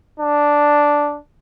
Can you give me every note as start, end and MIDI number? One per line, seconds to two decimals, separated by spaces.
0.20 1.18 62